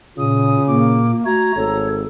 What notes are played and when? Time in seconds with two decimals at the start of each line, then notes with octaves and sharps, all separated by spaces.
0.18 A#2 C#3 D#6
0.67 A#2 A#3 D6
1.26 A3 F#4 A#5 G#6
1.56 G#1 A4 C#5